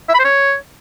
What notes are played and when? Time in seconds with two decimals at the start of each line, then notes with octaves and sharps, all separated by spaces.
0.09 E5
0.14 B5
0.19 C5
0.24 C#5